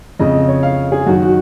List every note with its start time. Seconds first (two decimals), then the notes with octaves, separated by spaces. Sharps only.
0.20 F2 C#3 D#5
0.48 C#5
0.63 F5
0.92 G#4
1.06 F#2 D#3 F#4
1.23 F#4